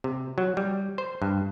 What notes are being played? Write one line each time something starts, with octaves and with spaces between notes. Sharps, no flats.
C3
F#3
G3
C5
G2